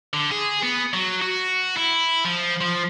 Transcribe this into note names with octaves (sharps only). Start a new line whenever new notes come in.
D3
G#4
B3
F#3
F#4
E4
F3
F3